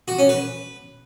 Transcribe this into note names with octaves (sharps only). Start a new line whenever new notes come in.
F#4
C#4
B4